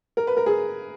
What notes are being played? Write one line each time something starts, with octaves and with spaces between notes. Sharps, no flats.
A#4
B4
A#4
G#4